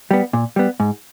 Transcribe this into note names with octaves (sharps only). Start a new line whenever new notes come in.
G3 B3
A#2
G3 B3
G#2